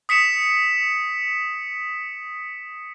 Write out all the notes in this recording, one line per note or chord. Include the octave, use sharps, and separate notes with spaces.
D#6 B6 C#7 E7